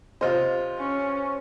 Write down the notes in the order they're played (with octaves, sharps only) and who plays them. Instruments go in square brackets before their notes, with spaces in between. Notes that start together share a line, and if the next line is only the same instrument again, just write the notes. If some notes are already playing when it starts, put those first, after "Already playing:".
[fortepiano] C3 F4 D#5 [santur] C5
[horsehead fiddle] C#4